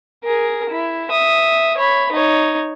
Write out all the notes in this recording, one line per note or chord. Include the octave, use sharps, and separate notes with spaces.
G#4 A#4
E4
E5 D#6
C#5 B5
D#4 C#5